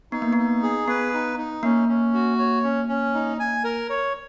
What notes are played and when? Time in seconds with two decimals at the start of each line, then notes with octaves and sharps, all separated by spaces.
0.12 B3 D#4
0.22 A#3
0.33 B3 D#4
0.63 G#4
0.88 B3 B4
1.13 D#4
1.38 D#4
1.63 A#3 C#4
1.89 C#4
2.14 F#4
2.38 C#5
2.64 C#4
2.88 C#4
3.14 D#4
3.40 G#5
3.64 A#4
3.90 C#5